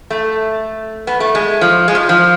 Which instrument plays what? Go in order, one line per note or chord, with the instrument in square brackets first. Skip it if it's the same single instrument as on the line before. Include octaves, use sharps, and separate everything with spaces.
[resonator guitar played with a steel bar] A3
B3
A3
G#3
F3
G#3
F3
F3